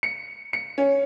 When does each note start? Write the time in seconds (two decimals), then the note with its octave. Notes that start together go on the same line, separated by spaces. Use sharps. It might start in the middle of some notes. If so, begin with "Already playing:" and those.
0.03 C#7
0.53 C#7
0.78 C#4